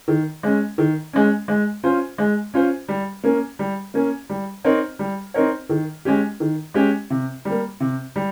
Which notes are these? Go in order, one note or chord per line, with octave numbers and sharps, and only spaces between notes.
D#3
G#3 C#4
D#3
G#3 C#4
G#3
C#4 F4 C5
G#3
C#4 F4 C5
G3
A#3 C#4
G3
A#3 C#4
G3
C4 D#4 A#4 C#5
G3
C4 D#4 A#4 C#5
D#3
G#3 C#4 G4
D#3
G#3 C#4 G4
C3
G3 A#3
C3
G3